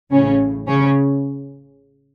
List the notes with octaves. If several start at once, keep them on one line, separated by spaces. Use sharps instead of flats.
A1 A2 C#3 C#4
C#3 C#4